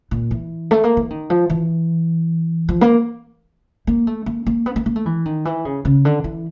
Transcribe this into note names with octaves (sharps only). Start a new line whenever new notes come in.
A#2
E3
A3
A#3
E3
D#3
F3
E3
F3
A#3
A#3
A3
A#3
A#3
B3
A#3
A#3
A3
E3
D#3
E3
C#3
C#3
D3
E3